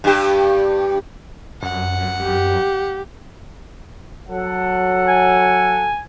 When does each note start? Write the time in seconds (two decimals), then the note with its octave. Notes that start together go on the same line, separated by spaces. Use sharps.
0.04 G2 G4
1.63 F#2 F#5
2.22 G4
4.29 F#3 A4 F#5
5.08 G#5